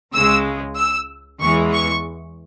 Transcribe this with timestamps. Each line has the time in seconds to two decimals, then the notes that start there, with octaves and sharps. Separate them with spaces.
0.13 C#2 C#3 G#3 E6
0.77 E6
1.41 E2 E3 G#3 C#6
1.73 C#6